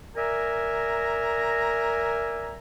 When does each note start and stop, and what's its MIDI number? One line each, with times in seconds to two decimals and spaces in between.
0.16 2.58 70
0.16 2.58 74
0.16 2.58 76
0.16 2.58 80
0.16 2.58 82